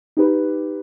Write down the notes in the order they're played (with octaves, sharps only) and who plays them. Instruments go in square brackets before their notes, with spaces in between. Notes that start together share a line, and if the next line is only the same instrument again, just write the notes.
[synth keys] D#4 G4 B4